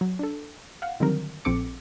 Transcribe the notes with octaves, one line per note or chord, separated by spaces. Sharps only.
F#3
D4 A4
F5 F#5
D3 D#3 F#3 G3 C4 A#4
A#1 F3 C4 A4 D6 C#7